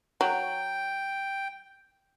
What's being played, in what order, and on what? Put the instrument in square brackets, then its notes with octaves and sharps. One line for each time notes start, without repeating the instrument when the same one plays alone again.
[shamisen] F#3 [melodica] G5